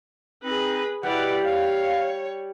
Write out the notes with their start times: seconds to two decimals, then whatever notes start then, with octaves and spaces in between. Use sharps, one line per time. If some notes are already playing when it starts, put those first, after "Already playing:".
0.44 C4 D#4 G#4 B4
1.03 B2 G3 E4 B4 D5 F#5
1.45 C#5 F5